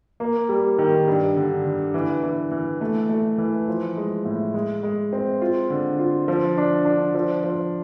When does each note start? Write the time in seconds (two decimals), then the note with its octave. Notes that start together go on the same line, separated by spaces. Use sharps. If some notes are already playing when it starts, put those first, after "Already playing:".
0.20 A#3
0.49 G3
0.78 D#3
1.08 G2
1.36 D3
1.65 D3
1.94 E3
2.23 E3
2.51 E3
2.81 A3
3.09 A3
3.38 E3
3.68 F3
3.97 G#3
4.25 A2
4.54 G#3
4.83 G#3
5.13 C4
5.42 F4
5.70 D3
5.99 F4
6.28 F3
6.58 D4
6.85 D4
7.15 F3
7.44 F3